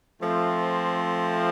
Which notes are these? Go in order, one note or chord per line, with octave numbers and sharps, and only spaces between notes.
F3 A3 C4